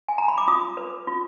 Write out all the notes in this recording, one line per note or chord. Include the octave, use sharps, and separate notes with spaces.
G#5
A#5
B5
D6
F4 D#6
B4
F4